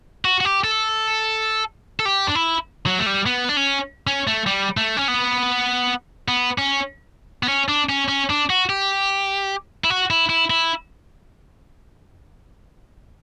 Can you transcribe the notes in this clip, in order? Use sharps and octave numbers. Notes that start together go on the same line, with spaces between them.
F#4
F#4
G4
A4
A4
G4
D4
E4
F#3
A3
G3
B3
D4
C#4
C#4
A3
G3
A3
C#4
B3
B3
C#4
B3
C#4
D4
C#4
C#4
D4
F#4
G4
E4
F#4
E4
E4
E4